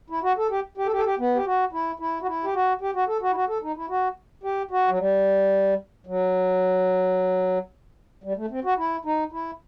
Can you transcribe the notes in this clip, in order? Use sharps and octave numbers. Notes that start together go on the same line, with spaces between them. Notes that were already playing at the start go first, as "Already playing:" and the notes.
E4
F#4
A4
G4
G4
A4
G4
A4
G4
B3
G4
F#4
E4
E4
F#4
E4
G4
F#4
G4
F#4
A4
F#4
E4
F#4
A4
D#4
E4
F#4
G4
F#4
F#3
G3
F#3
G3
A3
C4
F#4
E4
D#4
E4